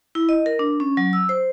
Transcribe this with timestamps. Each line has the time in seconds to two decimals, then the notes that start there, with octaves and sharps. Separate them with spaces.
0.15 E4
0.29 D#5
0.46 A#4
0.59 D4
0.80 C#4
0.97 F#3
1.13 E6
1.29 C5